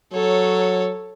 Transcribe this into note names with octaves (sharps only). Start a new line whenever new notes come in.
F#3 A4 C#5